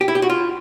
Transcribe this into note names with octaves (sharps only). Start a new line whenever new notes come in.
G4
E4
G4
F#4
F4